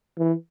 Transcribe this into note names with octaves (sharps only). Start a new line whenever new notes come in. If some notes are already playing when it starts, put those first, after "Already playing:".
E3